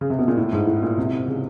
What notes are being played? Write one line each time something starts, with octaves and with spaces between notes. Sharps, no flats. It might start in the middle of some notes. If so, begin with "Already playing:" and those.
C#3
C3
B2
A#2
A2
G#2
A2
A#2
C3
C#3